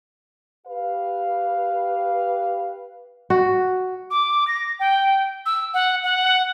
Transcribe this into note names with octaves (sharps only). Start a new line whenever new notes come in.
G4 B4 F5
F#4
D6
A#6
G5
E6
F#5
F#5